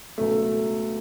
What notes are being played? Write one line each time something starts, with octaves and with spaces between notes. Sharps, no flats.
C#2 B2 F#3 A3